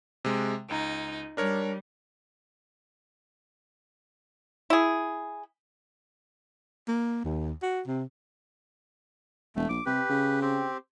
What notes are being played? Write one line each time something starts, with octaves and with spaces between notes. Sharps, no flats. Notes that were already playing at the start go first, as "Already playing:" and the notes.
C3 G#3
C#2 D#4 A#5
G3 D4 A#4 C#5
E4 G#4
A#3
D#2
F#4
C3
E1 A3
A#1 D6
C3 G4 B4
C#3
C4 G4